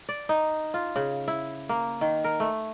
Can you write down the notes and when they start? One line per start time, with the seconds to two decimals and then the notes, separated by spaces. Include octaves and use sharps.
0.09 D5
0.29 D#4
0.74 F4
0.96 C#3
1.28 E4
1.69 A#3
2.01 D#3
2.24 A#4
2.40 A3